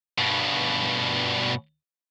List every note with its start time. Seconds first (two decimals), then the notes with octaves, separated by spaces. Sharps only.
0.18 G2 B2